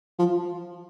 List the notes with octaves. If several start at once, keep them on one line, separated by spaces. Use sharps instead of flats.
F3